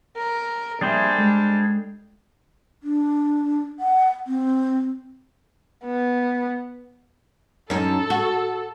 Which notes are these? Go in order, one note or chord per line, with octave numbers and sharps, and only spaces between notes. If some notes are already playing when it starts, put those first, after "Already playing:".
A#4
F3 G3 A#3 D4 G#4 C5 E5
G#3 A4
D4
F#5
C4
B3
F#2 D#4 A4
F#4